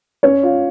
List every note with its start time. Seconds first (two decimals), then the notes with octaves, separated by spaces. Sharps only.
0.23 C#4 C#5
0.43 F4